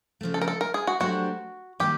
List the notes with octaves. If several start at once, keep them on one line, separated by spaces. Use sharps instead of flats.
C#3 F3 A3
A4
A#4
A4
A#4
G#4
F#4
F#3 A3 D4 F#4 G4 C5
D#3 G3 A#3 G4